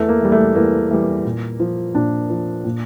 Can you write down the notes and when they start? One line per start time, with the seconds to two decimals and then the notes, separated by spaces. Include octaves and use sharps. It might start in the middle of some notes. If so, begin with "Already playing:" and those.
Already playing: E2 A3
0.08 A#3
0.21 E3 G3
0.32 A3
0.55 E2 A#3
0.91 E3 G3
1.24 A#2
1.60 F3
1.94 A#2 D4
2.30 F3
2.64 A#2